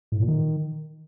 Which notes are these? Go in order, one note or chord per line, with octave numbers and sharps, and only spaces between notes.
A2
A#2
D#3